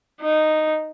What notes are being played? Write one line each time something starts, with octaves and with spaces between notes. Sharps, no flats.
D#4